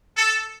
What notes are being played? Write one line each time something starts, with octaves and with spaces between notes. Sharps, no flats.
A4